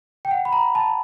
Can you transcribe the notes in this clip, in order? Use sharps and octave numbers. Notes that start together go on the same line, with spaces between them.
G5
F#5
B5
A#5
A5